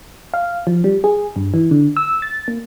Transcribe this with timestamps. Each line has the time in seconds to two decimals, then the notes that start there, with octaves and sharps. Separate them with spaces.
0.34 F5
0.67 F3
0.84 G3
1.04 G#4
1.36 G2
1.54 E3
1.71 D3
1.97 E6
2.22 A6
2.48 A#3